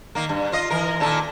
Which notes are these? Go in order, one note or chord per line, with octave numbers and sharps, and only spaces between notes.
D#3 A#3
G2
F4 D#5
E3 A#4
A#2 D#3 A4